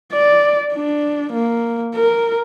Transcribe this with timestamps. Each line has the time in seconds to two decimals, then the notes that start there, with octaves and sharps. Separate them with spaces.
0.13 D5
0.74 D4
1.33 A#3
1.95 A#4